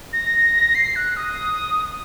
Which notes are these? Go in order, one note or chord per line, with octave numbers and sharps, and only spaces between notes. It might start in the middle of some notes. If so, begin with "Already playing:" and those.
A#6
C7
F#6
D#6